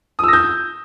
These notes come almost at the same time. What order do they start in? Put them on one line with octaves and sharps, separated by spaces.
D#6 E6 A#6 G6